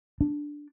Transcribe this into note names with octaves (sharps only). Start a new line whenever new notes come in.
D4